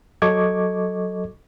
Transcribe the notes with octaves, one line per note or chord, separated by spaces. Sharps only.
F#3 A4 D#5 C#6 D6 G#6